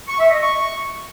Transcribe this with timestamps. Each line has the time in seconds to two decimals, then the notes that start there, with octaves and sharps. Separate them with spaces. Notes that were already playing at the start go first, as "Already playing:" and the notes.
0.08 C#6
0.19 E5
0.30 D#5
0.42 C#6